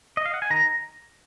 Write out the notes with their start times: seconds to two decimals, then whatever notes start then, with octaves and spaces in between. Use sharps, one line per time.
0.17 D#5
0.25 F5
0.34 F#5
0.42 G#5
0.50 D#3 A#5